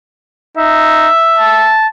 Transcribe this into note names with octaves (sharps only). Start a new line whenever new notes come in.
D#4 E5
A5